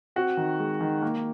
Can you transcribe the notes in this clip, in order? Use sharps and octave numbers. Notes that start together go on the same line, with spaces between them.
C4 F#4
D#3
G#3
D#3
A#3